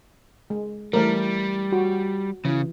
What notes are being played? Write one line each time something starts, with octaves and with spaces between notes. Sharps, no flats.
G#3
E3 G3 A3 A#4
F#4
C#3 E3